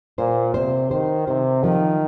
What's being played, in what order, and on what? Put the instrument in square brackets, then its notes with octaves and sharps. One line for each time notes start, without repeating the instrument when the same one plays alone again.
[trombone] A#2 [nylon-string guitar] C5
[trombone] C3 [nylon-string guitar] C5
[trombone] D#3 [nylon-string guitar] C5
[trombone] C3 [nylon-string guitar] C5
[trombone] D#3 [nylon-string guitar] F3